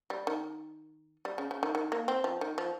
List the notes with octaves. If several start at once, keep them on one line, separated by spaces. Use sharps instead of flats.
G3
D#3
G3
C#3
C#3
D#3
D#3
A#3
C4
F3
D#3
F3